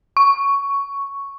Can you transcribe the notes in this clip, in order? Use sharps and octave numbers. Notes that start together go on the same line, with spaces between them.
C#6